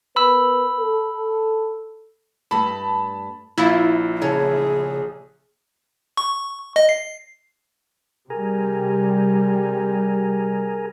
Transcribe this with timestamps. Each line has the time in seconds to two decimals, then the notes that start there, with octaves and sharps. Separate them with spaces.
0.16 B3 A#4 B4 B5 E6
0.79 A4
2.51 G2 A3 A5 B5
3.58 A#1 E4 F4
4.21 C#3 G#4 C#5 A5
6.17 C#6
6.76 D#5
6.89 C7
8.30 C3 G3 G#4 A#4